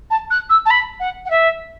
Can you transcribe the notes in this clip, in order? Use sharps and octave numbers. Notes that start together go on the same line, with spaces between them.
A5
F#6
E6
A5
B5
F#5
F#5
E5